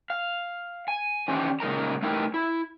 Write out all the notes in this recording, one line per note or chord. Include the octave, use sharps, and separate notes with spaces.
F5
G#5
D#3 E3 C#4 D4 G4 C5
A#2 C#3 G#3 D#4 A#4 A#5
A3 D#4 E4 G4 A#4 B4
E4